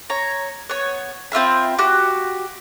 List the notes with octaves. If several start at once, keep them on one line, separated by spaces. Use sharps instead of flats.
C#5 A#5
B3 C#5
C4 F4 E5 B5
F#4 G4